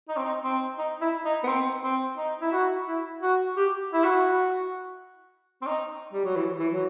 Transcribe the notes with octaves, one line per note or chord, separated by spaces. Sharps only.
D#4
C4
D#4
C4
D#4
E4
D#4
B3
C4
C4
D#4
E4
F#4
E4
F#4
G4
E4
F#4
C4
D#4
G3
F#3
E3
E3
F#3